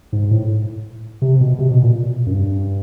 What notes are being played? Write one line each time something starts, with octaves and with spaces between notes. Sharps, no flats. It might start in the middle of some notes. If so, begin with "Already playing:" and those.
G#2
A2
C3
B2
C3
B2
A#2
F#2
G2